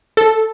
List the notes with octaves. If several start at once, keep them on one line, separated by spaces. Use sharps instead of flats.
A4